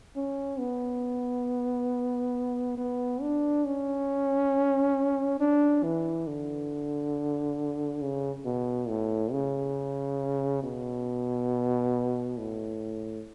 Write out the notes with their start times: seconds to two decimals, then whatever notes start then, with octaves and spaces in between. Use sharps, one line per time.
0.16 C#4
0.59 B3
2.77 B3
3.22 D4
3.65 C#4
5.40 D4
5.83 E3
6.27 D3
8.02 C#3
8.45 B2
8.88 A2
9.32 C#3
10.63 B2
12.38 A2